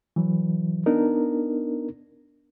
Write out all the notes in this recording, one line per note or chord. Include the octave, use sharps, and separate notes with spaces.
E3 F#3
B3 D4 D#4 A#4